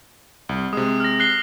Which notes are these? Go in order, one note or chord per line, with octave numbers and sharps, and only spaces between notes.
C2
C3 G#3 D#6
F6 A#6
F#6 C7 G7